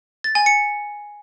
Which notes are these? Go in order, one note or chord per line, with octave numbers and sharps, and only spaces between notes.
A6
G#5
C#7